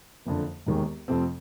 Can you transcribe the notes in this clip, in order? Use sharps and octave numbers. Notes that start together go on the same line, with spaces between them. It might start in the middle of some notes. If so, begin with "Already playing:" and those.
F#1 F2 D3
E1 D#2 D#3 G#3
F2 C3 F3 A3 C4